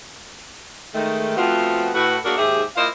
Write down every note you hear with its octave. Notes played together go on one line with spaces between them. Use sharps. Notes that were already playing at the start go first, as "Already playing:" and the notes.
D#3 G#3 A3
F3 A3 B3 C4 F4 F#4
A2 F#4 B4
A3 A#3 D4 F#4 G#4 A#4
D#2 G#2 G4 G#4 E5
A#3 E4 F4 C5 D#5 F5